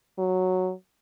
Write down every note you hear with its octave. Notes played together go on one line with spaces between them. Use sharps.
F#3